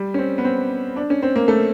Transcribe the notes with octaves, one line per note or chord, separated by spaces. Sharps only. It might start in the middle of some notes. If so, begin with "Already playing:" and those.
Already playing: G3
C#4
C4
B3
C4
D4
C#4
C4
A#3
A3